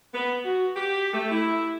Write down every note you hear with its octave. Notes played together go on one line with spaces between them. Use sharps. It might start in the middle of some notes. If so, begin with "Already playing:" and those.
B3
F#4
G4
A3
E4